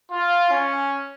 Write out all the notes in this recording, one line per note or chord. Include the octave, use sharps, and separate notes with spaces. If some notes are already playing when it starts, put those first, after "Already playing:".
F4
C#4